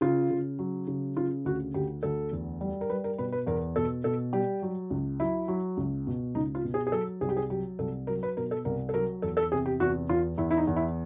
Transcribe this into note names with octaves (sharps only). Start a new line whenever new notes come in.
C#3 F4
C#3
F#3
C#3
C#3 F4
D2 F#4
D2 G4
D2 A4
E2
G3
A#4
G3 B4
A#4
B2 B4
B4
E2 A#4
B2 A4
B2 A4
G3 G4
F#3
C#2
F#3 E4
F#3
C#2
B2
C#2 D#4
F4
B2
G#4
G#4
F#3 A4
C2 G#4
G4
G#4
F#3 G4
C2 A4
F#3 A#4
B4
B2 A#4
A4
C2 A#4
A4
F#3 A#4
E2 A4
A4
C3 G#4
G4
E2 F#4
E2 F4
E2 E4
E4
D#4
E2
E4